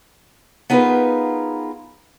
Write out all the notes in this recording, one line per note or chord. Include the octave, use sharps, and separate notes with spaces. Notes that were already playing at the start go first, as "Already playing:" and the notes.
B3 D#4 F4 G#4 A#4 B4